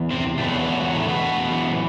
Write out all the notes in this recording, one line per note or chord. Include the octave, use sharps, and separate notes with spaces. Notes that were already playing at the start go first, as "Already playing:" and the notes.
Already playing: E2
C3 C4
E2 A2 B2 A3
F#3
E3
F#3
F#3
A2 A3
B2 B3
F#2 E3